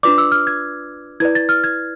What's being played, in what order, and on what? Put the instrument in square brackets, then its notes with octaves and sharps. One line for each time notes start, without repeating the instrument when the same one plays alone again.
[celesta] D4 F4 B4 D5 D6
E6
F6
G#6
E4 B4 D5 G#6
A6
F6
G#6